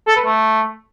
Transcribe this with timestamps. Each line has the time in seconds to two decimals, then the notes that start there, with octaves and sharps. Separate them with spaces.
0.07 A4
0.16 B4
0.25 A3